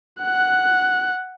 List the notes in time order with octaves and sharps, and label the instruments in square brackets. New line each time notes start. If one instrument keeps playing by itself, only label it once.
[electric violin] F#5 F#6